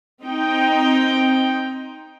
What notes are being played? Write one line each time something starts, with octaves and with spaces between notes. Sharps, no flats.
C4 D#4 G5